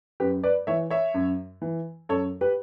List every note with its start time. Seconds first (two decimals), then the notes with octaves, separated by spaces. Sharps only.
0.20 F#2 G4 B4
0.44 B4 D5
0.67 E3 C#5 E5
0.90 C#5 E5
1.14 F#2
1.62 E3
2.09 F#2 A4 C#5
2.41 G4 B4